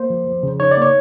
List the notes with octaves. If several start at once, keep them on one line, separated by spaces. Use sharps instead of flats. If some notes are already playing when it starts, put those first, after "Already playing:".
Already playing: A#3 C5
F3
F3
C#3
D#4 C#5
D5
A#3 C#5